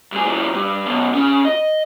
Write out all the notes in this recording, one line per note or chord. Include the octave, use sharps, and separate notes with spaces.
G2 G#4
F#2 E3
G2
F#2 B2
C#4 G#4
D#5